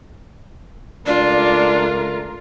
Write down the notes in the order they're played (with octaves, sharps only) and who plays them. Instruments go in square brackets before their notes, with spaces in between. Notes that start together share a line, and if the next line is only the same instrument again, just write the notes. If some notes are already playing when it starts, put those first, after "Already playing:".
[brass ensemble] C#2 A3 A#4 [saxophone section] D4 [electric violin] F4 [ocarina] D5